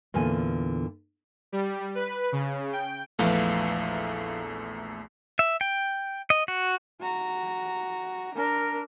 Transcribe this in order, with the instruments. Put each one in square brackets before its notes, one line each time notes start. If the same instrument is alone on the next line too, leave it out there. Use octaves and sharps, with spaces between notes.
[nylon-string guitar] E2 A#2 D3 G#5
[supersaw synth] G3
B4
C#3
G5
[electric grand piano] A#1 E2 A3 [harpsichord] E3 F3
[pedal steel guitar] E5
G5
D#5
F#4
[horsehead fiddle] F#4 A#5
[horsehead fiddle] D4 [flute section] A#4